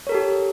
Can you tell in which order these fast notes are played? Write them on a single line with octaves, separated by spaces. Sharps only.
C#5 A#4 A4 G4